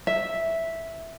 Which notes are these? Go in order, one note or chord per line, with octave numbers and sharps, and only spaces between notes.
E5